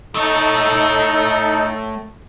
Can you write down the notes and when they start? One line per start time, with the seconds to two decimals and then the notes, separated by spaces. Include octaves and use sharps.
0.15 A3 D#4 A4 C#5